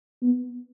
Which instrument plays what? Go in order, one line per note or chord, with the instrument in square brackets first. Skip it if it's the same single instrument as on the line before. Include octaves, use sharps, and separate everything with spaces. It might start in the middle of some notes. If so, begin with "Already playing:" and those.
[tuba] B3